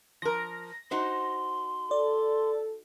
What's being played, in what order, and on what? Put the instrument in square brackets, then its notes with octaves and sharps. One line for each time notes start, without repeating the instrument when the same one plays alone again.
[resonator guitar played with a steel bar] F3 A#4 [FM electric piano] A#6
[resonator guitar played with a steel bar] D#4 F#4 C5 [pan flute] C6
[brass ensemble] A4 [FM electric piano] D5